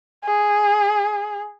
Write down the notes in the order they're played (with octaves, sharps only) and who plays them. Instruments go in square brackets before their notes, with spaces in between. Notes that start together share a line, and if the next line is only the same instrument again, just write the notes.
[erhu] G#4